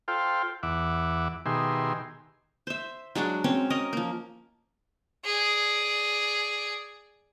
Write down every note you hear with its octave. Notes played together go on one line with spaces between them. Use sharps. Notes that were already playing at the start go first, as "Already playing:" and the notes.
F4 A4 C5 F5 G5
E2 E5 F#5 D6
B2 D#3 G4 G#4 E5 C6
C5 E5
F#3 G#3 D4 F#4
C4 C#4 C#5
C#4 A#4 D#5
F3 A#3
G#4 D5